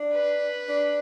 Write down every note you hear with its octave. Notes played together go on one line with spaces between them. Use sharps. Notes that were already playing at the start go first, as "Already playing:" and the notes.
Already playing: D4
B4
D4